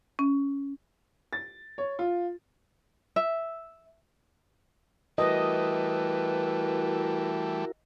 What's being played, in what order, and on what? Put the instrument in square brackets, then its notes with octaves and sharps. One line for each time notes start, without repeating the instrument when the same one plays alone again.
[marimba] C#4
[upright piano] A6
C#5
F4
[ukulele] E5
[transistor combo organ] E3 G3 A3 [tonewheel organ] E4 F#4 A#4 [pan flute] B4 [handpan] D#5